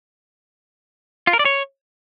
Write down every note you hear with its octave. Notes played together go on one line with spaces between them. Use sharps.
F4
A#4
D5
C#5